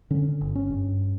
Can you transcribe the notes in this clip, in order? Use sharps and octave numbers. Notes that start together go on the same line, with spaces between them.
D3 C#4
G1
C#4
G2